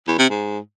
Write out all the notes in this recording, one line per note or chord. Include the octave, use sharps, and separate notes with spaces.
E2
C3
G#2